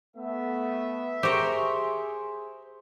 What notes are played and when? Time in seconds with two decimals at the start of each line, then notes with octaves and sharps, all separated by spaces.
0.17 A3 B3 E5
1.23 G4 G#4 A#4 C5 C#6